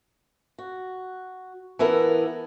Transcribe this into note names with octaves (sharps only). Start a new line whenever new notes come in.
F#4
E3 B3 E4 A4 A#4